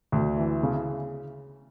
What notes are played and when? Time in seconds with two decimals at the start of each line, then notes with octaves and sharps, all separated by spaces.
0.12 D2
0.38 E3
0.63 C#3